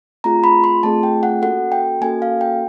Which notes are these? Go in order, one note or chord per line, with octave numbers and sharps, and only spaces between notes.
A3 C4 F4 G#4 A#5
B5
C6
A3 C4 F4 G#4 A5
G5
F#5
A#3 C#4 F#4 A4 F#5
G5
A#3 C#4 F#4 A4 G#5
F5
G5